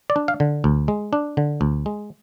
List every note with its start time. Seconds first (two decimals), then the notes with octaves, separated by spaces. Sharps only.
0.10 D5
0.16 D4
0.28 F5
0.40 D3
0.64 D2
0.88 G#3
1.13 D4
1.37 D3
1.61 D2
1.86 G#3